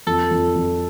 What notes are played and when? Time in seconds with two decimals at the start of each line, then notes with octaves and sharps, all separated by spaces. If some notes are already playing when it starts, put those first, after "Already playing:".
0.07 F2 A4
0.31 F2
0.56 F2